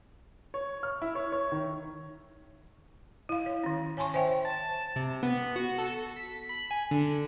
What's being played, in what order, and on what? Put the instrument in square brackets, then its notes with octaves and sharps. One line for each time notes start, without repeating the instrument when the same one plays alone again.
[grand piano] C#5
F6
E4
C#5
C#5
D#3
[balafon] E4 F5
C#5
D#3 C#4
C#5 G#5 A5 C6 C#6
C5 C#5 E5 G5
[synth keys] A5
C3
B3
F#4
A4
B6
B5
G#5
D3